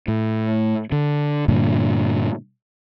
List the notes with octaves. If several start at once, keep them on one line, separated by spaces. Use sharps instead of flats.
A2
D3
G2 A#2 D3